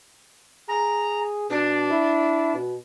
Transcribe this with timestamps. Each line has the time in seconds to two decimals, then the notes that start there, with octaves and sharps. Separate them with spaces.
0.68 G#4 A#5
1.50 B2 D4
1.90 E4
2.54 B2